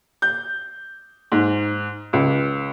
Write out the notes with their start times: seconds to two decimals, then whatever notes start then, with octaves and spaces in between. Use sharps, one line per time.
0.22 G6
1.32 G#2
2.13 C#2